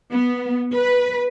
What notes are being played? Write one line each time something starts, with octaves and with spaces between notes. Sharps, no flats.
B3
B4